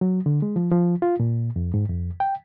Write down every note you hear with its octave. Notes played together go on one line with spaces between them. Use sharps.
F#3
D3
G#3
F3
F3
F4
A#2
F2
G#2
F2
G5